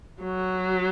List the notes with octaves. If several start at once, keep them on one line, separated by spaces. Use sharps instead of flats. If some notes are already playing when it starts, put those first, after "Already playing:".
F#3